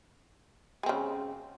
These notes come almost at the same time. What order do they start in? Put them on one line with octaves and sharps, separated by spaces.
G#3 C4 C#3